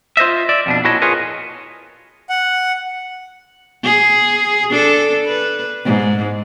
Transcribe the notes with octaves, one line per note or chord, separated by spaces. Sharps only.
F4 C5 D#5 E5
D5 E5
F2 B2 D4
A#2 E4 F#4 C#5 D#5 A5
F4 G#4 A#4 B4 C#5 D#5
F#5
G#4
D4 A4
B4
G#2